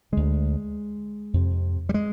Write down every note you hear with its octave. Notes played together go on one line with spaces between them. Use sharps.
D2 D3 G#3
F2 C3
G3
G#3